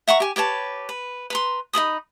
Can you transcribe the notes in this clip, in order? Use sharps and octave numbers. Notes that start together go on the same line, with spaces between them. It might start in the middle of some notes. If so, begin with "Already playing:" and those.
E5 F#5 A#5 C#6
G4 G#5
G4 B4 C#5 A5
B4
B4 A#5 C6
D#4 A4 B5 D#6